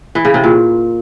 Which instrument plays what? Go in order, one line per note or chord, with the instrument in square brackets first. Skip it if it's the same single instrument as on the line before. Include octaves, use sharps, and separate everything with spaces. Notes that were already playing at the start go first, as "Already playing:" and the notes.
[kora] E3
C#3
C3
A#2